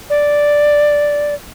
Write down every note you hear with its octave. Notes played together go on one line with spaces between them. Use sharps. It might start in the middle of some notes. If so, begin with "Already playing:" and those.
D5